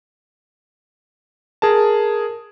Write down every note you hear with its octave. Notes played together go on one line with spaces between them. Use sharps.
G#4 A#4 A5